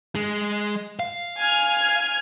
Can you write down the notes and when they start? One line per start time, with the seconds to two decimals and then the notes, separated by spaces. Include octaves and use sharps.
0.15 G#3
0.99 F5
1.39 G#5 F6 G#6